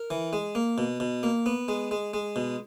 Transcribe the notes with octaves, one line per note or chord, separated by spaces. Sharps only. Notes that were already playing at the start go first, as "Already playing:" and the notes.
Already playing: A#4
E3
G#3
A#3
B2
B2
A#3
B3
G#3
G#3
G#3
B2